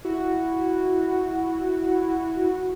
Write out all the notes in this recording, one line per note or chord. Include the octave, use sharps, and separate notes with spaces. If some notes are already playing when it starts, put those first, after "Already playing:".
E4 F#4